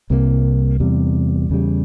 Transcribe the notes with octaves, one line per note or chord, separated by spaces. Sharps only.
C2 C3 E3 A#3
E2 C3 G3
E2 C#3 G3